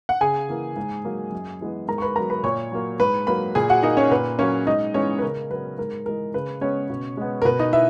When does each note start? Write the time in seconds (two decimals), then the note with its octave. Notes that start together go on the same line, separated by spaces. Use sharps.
0.09 F#5
0.21 C#3 G#4 G#5
0.48 E3 A#3
0.76 G#2
1.05 F#3 A#3
1.32 F#2
1.60 E3 G#3 B3
1.88 G#2 A#4 A#5
1.98 C#6
2.02 B4 B5
2.16 F#3 B3 A#4 A#5
2.30 B4 B5
2.43 A#2 C#5 C#6
2.72 F#3 A#3
3.00 G#2 B4 B5
3.27 F#3 A#3 B4 B5
3.55 A#2 G#4 G#5
3.70 F#4 F#5
3.83 A#3 D#4 D#5
3.97 C#4 C#5
4.11 A#2 B4
4.39 F#3 A#3 C#4 C#5
4.67 G#2 D#4 D#5
4.94 E3 G#3 B3 C#4 C#5
5.18 B4
5.22 C#3 A#4
5.50 F#3 B3 B4
5.78 G#2 A#4
6.06 E3 G#3 A#4
6.34 C#3 B4
6.61 G#3 B3 C#4 C#5
6.90 B2
7.17 G#3 B3
7.42 A#4
7.45 B2 B4
7.59 D#4 D#5
7.73 B3 E4 E5